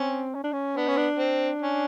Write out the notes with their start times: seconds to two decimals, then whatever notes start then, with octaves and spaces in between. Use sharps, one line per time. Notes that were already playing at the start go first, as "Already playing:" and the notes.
Already playing: C4 C#4
0.35 C#4
0.44 D4
0.53 C#4
0.77 B3 D4
0.87 C#4
0.97 D4
1.19 C4
1.62 C#4